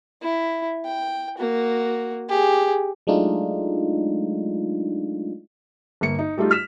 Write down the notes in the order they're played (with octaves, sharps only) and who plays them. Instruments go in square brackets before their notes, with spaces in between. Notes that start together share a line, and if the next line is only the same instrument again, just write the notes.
[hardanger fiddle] E4
G5
A#3 F#4
G4 G#4
[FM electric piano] F#3 G#3 A3 D4 D#4 F4
[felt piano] G1 A#3 C#7
D#4
G3 A3 D#4 F4 G4
F6 B6 E7